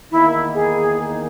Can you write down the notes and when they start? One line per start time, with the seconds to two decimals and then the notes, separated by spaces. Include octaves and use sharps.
0.11 E2 D#3 A#3 D#4 E4
0.54 G#4